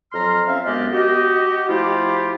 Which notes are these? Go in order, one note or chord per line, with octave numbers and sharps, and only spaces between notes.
F2 F#3 A#5 C6 F6
C4 C#4 E5 F5
F#2 G#3 B3 D4 G4 D#5
F#4 G4 D#5
F3 A3 E4 F4 G4